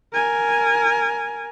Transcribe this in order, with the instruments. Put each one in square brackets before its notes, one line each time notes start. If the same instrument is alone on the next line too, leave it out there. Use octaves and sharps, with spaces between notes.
[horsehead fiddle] A#4 G#5